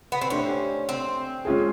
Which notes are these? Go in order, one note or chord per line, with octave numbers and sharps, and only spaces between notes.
B3
C4
A3 C#4 D4 G4 C5
C4
G#3 C#4 F4 G#4